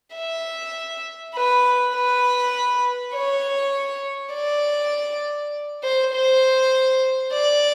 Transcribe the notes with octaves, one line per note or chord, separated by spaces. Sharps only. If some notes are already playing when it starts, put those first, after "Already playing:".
E5
B4
B4
C#5
D5
C5
C5
D5